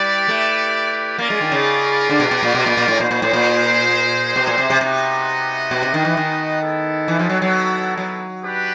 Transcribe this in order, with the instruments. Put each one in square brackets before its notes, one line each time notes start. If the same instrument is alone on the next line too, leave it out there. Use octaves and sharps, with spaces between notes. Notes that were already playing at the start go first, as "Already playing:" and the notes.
Already playing: [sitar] G3 [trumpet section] E4 G4 B4 D5
[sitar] A3
[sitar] A#3 [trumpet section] C#4 F4 A#4 D5
[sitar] G#3
D#3
C#3
D3
B2
B2
A#2
B2
A#2
A#2
A2
[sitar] A#2 [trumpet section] D#4 G#4 C5
[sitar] A#2
A2
A#2
B2
A#2
C3
C3
[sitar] C3 [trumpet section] B3 D#4 F#4 B4 D#5
[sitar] B2
C3
D#3
E3
D#3
[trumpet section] G#3 B3 E4 A4
[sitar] E3
F3
F#3
F#3
F#3
[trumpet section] D4 G4 B4